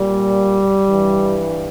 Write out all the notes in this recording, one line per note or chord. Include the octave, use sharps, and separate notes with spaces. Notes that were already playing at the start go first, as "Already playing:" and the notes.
Already playing: A#2 G3
G2 E3